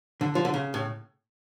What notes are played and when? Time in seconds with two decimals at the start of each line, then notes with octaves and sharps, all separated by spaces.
0.21 D3
0.35 F3
0.45 D3
0.54 C#3
0.74 A2